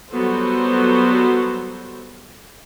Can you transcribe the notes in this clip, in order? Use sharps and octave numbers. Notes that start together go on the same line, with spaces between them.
F#3 G3 B3 F#4 A4 C5